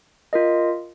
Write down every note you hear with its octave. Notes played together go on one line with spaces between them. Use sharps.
F4 A#4 D#5